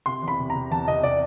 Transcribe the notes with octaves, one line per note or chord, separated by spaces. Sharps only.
C3 C6
E2
B5
C3
C3 A#5
E2 A5
C3 D#5
C3 D5